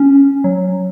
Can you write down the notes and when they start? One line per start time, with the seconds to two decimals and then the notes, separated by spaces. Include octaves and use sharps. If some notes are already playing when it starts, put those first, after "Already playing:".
Already playing: C#4
0.44 F#3